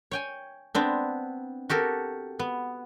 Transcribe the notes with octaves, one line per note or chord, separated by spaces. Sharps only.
C#5 G5 G#5
B3 C4 D4
F#4 G4 A4 A#4
B3